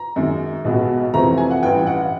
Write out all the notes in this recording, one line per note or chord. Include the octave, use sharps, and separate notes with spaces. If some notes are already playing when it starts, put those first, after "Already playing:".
Already playing: A#5
F#2 D#3 G#3
B1 B2 G#3 B3
F2 C3 E3 A3 C4 A#5
G#5
F#5
A1 G2 E3 G5
F#5